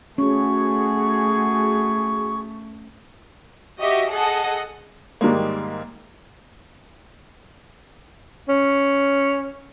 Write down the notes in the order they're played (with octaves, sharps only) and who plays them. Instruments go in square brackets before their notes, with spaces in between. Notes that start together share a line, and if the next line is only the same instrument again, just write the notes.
[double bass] A3 [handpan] C#4 [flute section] F#4 G#4 [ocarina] C#6
[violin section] F#4 G4 D#5 E5
G#4 A4 D#5 F#5
[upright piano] G#2 D#3 G3 G#3 A#3
[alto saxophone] C#4